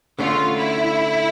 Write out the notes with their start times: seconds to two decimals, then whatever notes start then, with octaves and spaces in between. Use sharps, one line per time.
0.19 D3 A3 C#4 F4
0.57 E4